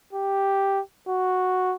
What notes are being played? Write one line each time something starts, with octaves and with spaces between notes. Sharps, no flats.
G4
F#4